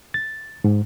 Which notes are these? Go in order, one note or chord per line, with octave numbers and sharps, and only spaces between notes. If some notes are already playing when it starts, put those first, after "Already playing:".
A6
G#2